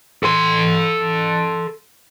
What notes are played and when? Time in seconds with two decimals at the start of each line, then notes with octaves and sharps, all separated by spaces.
0.23 A4 C6